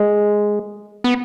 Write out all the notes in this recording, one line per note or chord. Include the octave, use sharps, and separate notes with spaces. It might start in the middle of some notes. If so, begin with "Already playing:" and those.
Already playing: G#3
B3